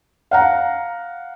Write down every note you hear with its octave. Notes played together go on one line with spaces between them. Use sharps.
F5 F#5 A#5